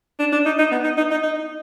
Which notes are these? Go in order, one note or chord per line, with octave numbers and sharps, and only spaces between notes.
D4
D4
D#4
D#4
B3
D#4
D#4
D#4
D#4